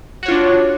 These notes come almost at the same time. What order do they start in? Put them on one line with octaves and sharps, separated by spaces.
F#4 C#5 F4 D4